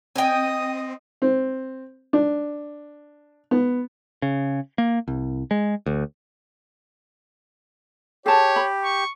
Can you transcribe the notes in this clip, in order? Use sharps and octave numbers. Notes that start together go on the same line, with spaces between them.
C4 D#5 G5 G#5 D#6
C4
D4
B3
C#3
A#3
C2
G#3
D2
G4 G#4 C#5 A5
B5
C#6